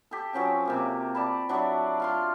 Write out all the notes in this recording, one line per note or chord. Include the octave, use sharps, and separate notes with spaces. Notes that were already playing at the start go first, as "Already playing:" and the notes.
G4 A4
F3 F#3 C#4 G5
C3 A#3 G4
D5 A5 B5
F#3 D4 E4
F4 F5 C6